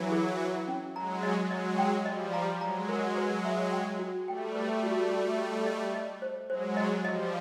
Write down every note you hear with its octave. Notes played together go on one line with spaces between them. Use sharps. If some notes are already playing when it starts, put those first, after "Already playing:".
Already playing: E3 F#3 E4
G#4
C#5
C#4
F#3 G#3 A#5
D#5
F#3 G#3 D#5
G5
F3 G3 D#5
A#5
F#3 G#3 A#5
A#4
B4
E5
G5
F#4
G3 A3 G5
B4
F#4
F#4
D#5
D#5
D#5
C5
F#3 G#3 C5
D#5
F3 G3 D#5